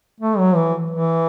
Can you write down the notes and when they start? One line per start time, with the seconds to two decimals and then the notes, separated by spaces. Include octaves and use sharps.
0.20 A3
0.38 F#3
0.56 E3
0.91 E3